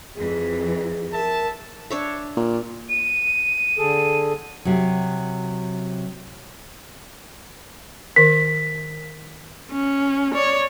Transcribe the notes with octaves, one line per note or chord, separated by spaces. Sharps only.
F2 E3 G#4
A#4 E5 A5
D4 C#5 E5
A#2
D#7
D3 G#4 A4
C3 F#3
D#3 A#4 B6
C#4
C#5 D5